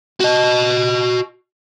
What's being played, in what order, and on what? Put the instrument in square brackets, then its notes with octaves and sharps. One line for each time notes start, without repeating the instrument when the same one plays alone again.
[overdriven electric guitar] F#4 D#5